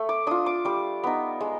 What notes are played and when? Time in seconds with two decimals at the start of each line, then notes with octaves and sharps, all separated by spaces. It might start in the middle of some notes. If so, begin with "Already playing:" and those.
Already playing: A3
0.09 D6
0.27 D4 F4 D#6
0.46 D6
0.65 G3 D6
1.04 B3 D#4
1.41 G#3